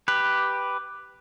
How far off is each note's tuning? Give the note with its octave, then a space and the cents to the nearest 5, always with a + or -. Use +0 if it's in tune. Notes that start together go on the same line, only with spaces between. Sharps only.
G4 +0 B4 +0